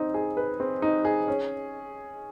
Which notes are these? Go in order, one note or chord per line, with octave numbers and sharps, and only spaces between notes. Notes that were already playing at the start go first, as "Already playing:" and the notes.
Already playing: C4 D#4
G#4
B4
C4
D#4
G#4
C#4